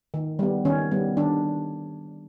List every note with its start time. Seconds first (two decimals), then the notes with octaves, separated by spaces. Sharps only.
0.14 D#3
0.39 G3 B3
0.65 D#3 C#4
0.91 G3 B3
1.17 D#3 D4